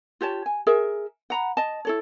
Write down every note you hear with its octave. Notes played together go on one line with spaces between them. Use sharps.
F4 G4 C#5 A5
G#5
G#4 A#4 E5
F#5 A#5 B5
D#5 A5
E4 A4 C#5